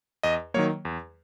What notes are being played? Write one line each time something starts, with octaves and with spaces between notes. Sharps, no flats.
E2 D#5
D#3 F#3 A#3 C#5
E2